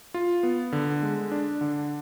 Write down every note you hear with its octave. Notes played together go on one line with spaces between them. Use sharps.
F4
B3
D3
G#3
D4
D3